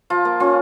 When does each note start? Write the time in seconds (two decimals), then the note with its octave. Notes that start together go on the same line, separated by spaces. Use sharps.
0.10 F3 F4
0.25 A#3
0.40 C#4 F4